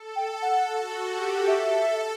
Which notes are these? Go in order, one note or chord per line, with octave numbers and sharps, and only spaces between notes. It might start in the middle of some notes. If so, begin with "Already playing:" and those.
Already playing: A4
G5
F#5
F#4
G4
A4 E5